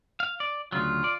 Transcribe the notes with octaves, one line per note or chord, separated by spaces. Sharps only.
F5
D5
D2 C#3 F#3 F4
D5